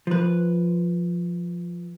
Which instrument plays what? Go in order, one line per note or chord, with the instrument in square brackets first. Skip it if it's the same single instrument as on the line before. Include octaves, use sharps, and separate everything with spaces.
[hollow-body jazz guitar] F3 B4